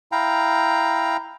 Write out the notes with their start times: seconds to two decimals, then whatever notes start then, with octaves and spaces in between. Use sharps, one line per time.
0.12 E4 F5 G5 A#5